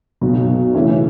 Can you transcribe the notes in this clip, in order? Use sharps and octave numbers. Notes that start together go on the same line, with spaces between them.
B1 B2 F#3
C#3 E3 A3 C#4